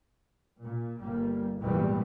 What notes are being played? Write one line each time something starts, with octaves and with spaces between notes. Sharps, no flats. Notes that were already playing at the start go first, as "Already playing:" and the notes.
A#2
G1 G3 A#3
G#1 E2 A#2 G3